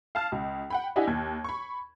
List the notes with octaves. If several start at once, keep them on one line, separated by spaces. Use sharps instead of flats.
F5 A5 F6
C#2
F#5 G5 B5
D4 E4 G4 D#5 F#5 G#5
D#2 G#6
B5 C#6